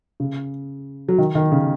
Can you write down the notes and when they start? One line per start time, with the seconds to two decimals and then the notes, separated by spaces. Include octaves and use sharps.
0.20 C#3
1.08 F#3
1.18 D#3
1.35 D#3
1.52 C#3